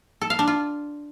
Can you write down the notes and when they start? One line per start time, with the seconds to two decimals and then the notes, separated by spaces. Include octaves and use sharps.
0.21 A4
0.30 F5
0.39 D4
0.47 F4